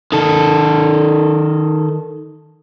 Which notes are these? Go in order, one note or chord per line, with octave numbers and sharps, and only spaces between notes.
D#3 A4